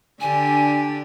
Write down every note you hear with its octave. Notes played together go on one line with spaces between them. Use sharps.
D3 D4 G4 G#5